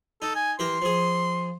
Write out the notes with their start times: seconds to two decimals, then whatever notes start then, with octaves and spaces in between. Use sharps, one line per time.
0.22 D#4 A4
0.36 G#5
0.59 E3 G4 A#4 C6
0.82 F3 G#4